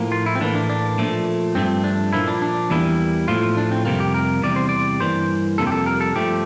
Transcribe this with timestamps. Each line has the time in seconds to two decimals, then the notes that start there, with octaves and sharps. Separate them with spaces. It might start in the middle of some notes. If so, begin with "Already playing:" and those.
Already playing: A2 F3 A#3
0.12 F4
0.26 E4
0.35 C4
0.41 A2 E3 A#3 D4
0.55 D4
0.70 D4
0.98 A#2 F3 A3
1.55 G2 F3 A3 C4
1.84 D4
2.13 A#2 F3 A#3 E4
2.28 D4
2.42 D4
2.70 E2 E3 G3 A#3 E4
3.28 A2 F3 A3 F4
3.57 D4
3.71 C4
3.85 F2 C3 G3 A#3 C4
4.00 G4
4.14 A#4
4.42 E2 C3 G3 D5
4.56 C5
4.69 D5
5.00 G2 E3 A#3 C5
5.58 F2 C3 G3 A#3 A4
5.67 G4
5.72 A4
5.86 A#4
6.01 A4
6.15 G2 F3 A3 G4